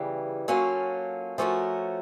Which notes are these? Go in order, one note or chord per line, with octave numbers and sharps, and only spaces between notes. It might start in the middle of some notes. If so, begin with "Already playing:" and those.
Already playing: E2 C#3 E3 G3
F#3 A#3 C#4 F4 A4
F3 A3 C#4 F#4 A#4